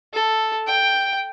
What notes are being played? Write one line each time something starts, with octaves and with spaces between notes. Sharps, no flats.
A4
G5